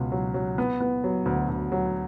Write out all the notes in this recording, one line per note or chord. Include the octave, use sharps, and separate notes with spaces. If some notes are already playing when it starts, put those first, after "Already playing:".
Already playing: C#2 B2 C#4
F#3
F#3
B3
B3
F#3
D2
D2
F#3